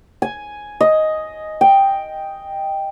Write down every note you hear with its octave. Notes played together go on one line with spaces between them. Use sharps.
G#5
D#5
G5